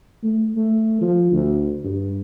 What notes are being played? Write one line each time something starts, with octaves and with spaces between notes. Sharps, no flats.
A3
A3
F3
D2
G2